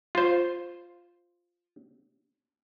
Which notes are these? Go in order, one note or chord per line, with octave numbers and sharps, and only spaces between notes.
F4 C5